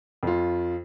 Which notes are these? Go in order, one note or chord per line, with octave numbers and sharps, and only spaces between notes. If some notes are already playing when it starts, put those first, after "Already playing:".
F2 F4